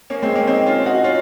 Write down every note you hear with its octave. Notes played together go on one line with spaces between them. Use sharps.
A#3 C#4
G#3 C4
A#3 C#4
C4 D#4
C#4 F4
D#4 F#4
C#4 F4